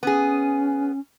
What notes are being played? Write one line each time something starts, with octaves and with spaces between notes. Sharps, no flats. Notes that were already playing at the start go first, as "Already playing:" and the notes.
B3 C#4 G#4